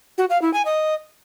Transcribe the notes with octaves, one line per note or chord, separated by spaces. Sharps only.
F#4
F5
E4
G#5
D#5